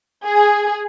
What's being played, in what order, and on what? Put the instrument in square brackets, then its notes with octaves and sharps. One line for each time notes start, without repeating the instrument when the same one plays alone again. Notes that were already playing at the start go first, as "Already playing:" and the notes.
[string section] G#4